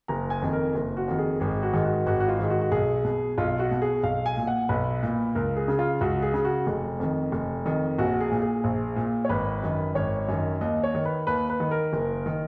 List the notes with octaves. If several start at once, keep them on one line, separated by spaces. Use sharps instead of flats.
F#1 A#5
G#5
F2 D#3
A#4
F#1
F#4
F2 D#3
G#4
G#1 G#4
F#4
G#2 D#3
F#4
G#1 F#4
F#4
F4
G#2 D#3
F#4
F#4
B1 G#4
B2
B1 F4
F#4
B2
G#4
B1 F5
G#5
A#2
F#5
B1 B4
A#2
C#2 A#4
G#4
C#3
F4
C#2 F#4
G#4
C#3
F#4
F1
F2 D#3
F1
F2 D#3
A#1 F#4
G#4
A#2
G#4
A#1
A#2
C#5
G#1 B4
F#2 D#3
G#1 C#5
F#2 D#3
D#2 D#5
C#5
D#3
B4
D#2 B4
B4
D#3
A#4
F#1
D#3